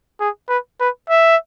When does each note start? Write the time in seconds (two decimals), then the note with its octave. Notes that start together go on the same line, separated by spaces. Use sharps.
0.20 G#4
0.49 B4
0.80 B4
1.10 E5